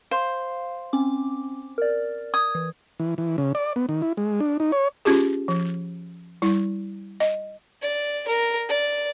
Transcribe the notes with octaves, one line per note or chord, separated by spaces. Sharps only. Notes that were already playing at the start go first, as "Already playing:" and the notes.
C5 F5
C4 C#4 D6
A#4 D5
D#6 G#6
E3
E3
E3
C#3
D5
B3
D#3
E4
G#3
D4
D#4
C#5
C#4 F4 G4 G#4
F3
G3 E4
D#5
D5
A#4
D5